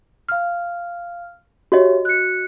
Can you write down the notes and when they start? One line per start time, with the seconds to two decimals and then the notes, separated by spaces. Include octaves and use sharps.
0.29 F5 F6
1.72 F#4 G4 C#5 D#5 E5
2.05 F#6 C#7